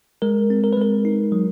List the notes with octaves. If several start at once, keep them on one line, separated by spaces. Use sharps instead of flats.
G#3 A#4
C4
A#4
B4
G#3 A#4
D#4
F#3